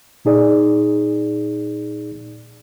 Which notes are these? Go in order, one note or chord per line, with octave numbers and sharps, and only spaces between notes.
A#2 D#4 G#4 D5